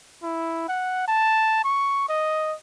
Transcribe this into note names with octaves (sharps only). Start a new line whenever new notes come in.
E4
F#5
A5
C#6
D#5